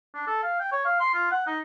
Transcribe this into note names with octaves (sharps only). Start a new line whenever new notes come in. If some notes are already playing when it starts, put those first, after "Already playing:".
D4
A4
F5
G5
C#5
F5
C6
F4
F#5
D#4